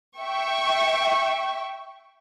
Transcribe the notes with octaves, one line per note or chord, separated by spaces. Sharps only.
E5 G5 C#6